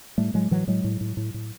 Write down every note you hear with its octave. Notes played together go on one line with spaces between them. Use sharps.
A2 G3 A3
A2 F#3 G#3
A2 E3 F#3
A2 F#3 G#3
A2
A2
A2
A2